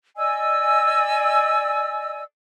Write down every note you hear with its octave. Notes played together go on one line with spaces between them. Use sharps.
D5 D#5 G#5 E6